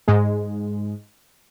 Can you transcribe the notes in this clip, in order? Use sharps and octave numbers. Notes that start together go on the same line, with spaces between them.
G#2 G#3